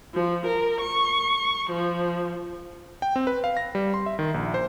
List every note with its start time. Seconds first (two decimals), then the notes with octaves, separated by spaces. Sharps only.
0.14 F3
0.46 A#4
0.81 C#6
1.70 F3
3.02 G5
3.16 C4
3.27 B4
3.44 F5
3.57 A#6
3.75 G3
3.94 C6
4.06 E5
4.19 D#3
4.34 A#1
4.54 C5